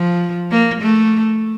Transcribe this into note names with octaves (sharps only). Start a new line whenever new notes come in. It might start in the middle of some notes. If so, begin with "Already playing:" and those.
Already playing: F3
A#3
A3